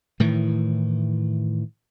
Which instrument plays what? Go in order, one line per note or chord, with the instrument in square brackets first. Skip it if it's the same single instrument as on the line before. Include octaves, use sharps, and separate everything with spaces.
[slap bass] A2 D#3 E3